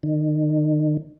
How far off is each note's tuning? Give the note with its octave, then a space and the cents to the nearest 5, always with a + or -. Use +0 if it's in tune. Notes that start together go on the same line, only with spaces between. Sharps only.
D#3 -35